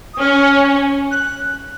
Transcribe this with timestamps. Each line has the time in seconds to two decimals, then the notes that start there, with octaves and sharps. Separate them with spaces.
0.14 D#6
0.20 C#4 F6
1.11 F#6